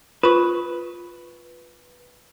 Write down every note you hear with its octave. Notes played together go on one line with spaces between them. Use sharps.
F4 B4 C#6